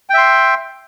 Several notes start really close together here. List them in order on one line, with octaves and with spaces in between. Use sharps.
G5 E5 C6